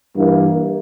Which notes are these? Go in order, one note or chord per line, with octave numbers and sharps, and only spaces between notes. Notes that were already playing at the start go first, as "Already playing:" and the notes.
G2 E3 G3 A#3